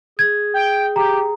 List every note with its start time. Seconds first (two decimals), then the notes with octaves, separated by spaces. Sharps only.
0.19 G#4 G#6
0.54 G5
0.96 G4 A#5